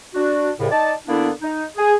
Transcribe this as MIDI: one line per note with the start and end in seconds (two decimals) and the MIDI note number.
0.15 0.50 62
0.15 0.50 66
0.59 0.67 36
0.59 0.67 45
0.59 0.67 49
0.71 0.93 63
0.71 0.93 74
0.71 0.93 81
1.07 1.30 50
1.07 1.30 58
1.07 1.30 59
1.07 1.30 62
1.07 1.30 64
1.42 1.64 63
1.77 1.94 68